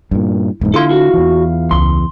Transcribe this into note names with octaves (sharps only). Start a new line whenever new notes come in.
G2 A#2 E4
E1 G#2 A#3
D3 E4 F4 A4 F5 C6
F#4
E2 E3
C#2 C6